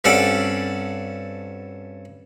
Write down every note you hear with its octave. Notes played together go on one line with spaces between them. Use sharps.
G2 C4 C#4 F#4 A4 D5